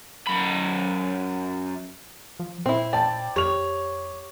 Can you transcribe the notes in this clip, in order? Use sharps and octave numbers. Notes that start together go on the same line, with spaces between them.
F#2 B5
F3
A#2 C4 E4
D5 G5 A5
F2 G4 C#5 F7